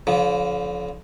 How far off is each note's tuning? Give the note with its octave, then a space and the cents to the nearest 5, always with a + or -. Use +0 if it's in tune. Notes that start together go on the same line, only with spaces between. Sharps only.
D3 -40 F3 +10